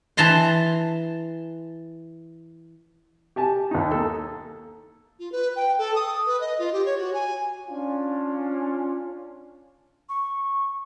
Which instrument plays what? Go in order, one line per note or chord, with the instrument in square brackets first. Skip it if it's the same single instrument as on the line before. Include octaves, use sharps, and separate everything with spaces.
[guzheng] E3 A5 A#5 C6
[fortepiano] G4 G#5 A5
D#2 D#4
A#3 A4
[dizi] F4
B4
G5
A4
D#6
B4
D#5
F4
G4
C#5
F#4
G#5
[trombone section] C#4 D4 F4
[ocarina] C#6